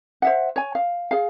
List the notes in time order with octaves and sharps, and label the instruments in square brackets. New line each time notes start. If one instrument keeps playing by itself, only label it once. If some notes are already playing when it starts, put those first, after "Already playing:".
[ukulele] C5 E5 F#5
C#5 G#5
F5
G#4 F5